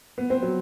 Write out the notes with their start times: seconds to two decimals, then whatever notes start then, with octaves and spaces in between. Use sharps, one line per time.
0.18 B3
0.30 C4
0.43 F#3